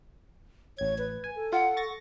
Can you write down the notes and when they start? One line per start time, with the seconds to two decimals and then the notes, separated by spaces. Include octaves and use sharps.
0.78 A1 C#5 G#6
0.98 B4
1.24 G#5
1.36 A4
1.53 F4 F#5
1.77 C#6 A6 A#6